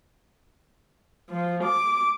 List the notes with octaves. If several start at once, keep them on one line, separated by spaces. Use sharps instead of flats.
F3
D6